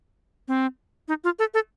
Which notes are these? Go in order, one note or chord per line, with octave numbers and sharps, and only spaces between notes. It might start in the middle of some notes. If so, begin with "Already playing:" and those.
C4
D#4
F4
A4
A4